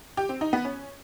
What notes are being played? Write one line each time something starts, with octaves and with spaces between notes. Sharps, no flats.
G4
C4
D#4
B3
C#4